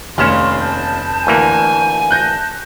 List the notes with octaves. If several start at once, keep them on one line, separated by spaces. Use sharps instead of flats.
F1 D#2 C#4 F5 C6 F6 E7
A5 G6
D2 E3 A#3 G#5
A5 F#6 G6 A#6